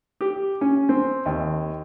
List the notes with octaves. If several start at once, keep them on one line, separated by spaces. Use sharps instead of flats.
G4
C#4
C4
D#2